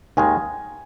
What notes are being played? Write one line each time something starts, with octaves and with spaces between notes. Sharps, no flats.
D#2 D#3 G#3 G#5